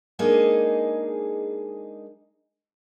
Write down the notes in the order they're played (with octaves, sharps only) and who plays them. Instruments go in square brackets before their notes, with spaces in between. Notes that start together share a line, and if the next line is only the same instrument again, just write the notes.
[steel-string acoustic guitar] G#3 A#3 D4 D#4 G#4 D#5